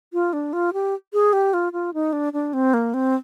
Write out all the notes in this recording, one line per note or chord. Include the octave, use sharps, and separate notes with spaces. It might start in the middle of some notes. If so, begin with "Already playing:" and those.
F4
D4
F4
G4
G#4
G4
F4
F4
D#4
D4
D4
C4
A#3
C4